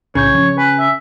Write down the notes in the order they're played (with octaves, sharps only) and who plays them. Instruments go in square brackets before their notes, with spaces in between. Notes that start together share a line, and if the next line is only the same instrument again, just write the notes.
[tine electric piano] B1 A2 G6 [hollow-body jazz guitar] C#3 [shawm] C#5
[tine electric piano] F3 C#4
[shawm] B4 [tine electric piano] G#5
[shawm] E5